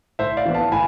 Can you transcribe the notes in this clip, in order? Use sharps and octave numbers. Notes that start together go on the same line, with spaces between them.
A2 C5 E5
D5 F5
E3 B3
F5 A5
A2 G#5 B5